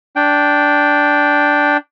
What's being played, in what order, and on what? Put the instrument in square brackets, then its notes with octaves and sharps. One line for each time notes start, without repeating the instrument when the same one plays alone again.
[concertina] D4 G5